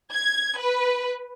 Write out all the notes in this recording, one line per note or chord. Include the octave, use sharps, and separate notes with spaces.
G#6
B4